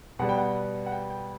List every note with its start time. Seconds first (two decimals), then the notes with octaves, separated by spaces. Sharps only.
0.19 B2 G3 B3 F#5
0.29 G5
0.38 F#5
0.86 F#5
0.92 G5
1.10 G5